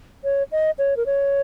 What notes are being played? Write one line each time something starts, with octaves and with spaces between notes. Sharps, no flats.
C#5
D#5
C#5
A#4
C#5